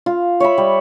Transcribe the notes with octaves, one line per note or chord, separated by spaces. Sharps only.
F4
C#5 E5 B5
G3